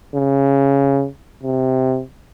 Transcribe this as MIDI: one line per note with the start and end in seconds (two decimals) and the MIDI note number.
0.15 1.06 49
1.43 2.01 48